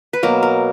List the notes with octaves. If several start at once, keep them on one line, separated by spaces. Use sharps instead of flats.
B4
B2 F#3 A#3 A#4
A#4